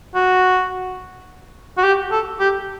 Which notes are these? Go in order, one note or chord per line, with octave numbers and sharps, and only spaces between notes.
F#4
F#4
G4
A4
G4